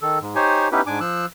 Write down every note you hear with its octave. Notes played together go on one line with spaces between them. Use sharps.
D#3 A4
G#2
D#4 G4 C5 C#5 G#5
B3 C#4 D#4 E4 G4 B4
G#2 D4 G#5 D6
F3 E6 F#6